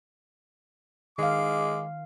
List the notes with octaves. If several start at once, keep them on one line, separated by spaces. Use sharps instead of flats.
D#3 G#3 F5 D6